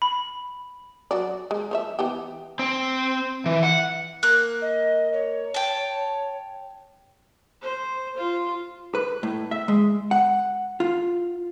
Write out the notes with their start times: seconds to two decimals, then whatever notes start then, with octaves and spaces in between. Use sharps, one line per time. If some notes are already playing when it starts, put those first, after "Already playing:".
0.02 B5
1.11 F#3 F#4 D5
1.51 G#3
1.71 F3 C#5 E5
1.99 E3 B3 G4
2.59 C4
3.46 E3
3.63 F#5
4.23 A#3 F#6
4.62 D#5
5.13 C#5
5.54 G5 A5
7.62 C5
8.17 F4
8.95 B4
9.23 A2
9.51 E5
9.68 G#3
10.11 F#5
10.80 F4